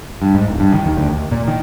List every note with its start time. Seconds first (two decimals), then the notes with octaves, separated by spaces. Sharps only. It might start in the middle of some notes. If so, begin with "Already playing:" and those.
0.22 G2
0.35 G#2
0.48 D1
0.60 G2
0.74 D#3
0.86 D#2
0.97 D2
1.09 D#2
1.32 A#2
1.48 D#3